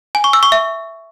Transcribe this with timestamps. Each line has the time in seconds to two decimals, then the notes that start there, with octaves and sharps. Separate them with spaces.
0.15 G#5
0.24 C#6
0.33 E6
0.43 C#6
0.52 E5